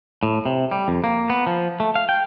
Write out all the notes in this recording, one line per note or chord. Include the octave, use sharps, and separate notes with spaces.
A2
C3
G3
F2
A#3
B3
F3
A3
F5
G5